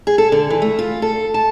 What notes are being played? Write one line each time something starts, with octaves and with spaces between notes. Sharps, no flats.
G#4
A4
D3
E3
A3
F4
A4
A5